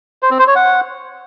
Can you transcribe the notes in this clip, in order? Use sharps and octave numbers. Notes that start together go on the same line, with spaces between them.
C5
C4
C5
C#5
F#5